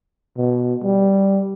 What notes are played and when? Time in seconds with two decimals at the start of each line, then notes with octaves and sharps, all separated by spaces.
0.37 B2
0.83 G3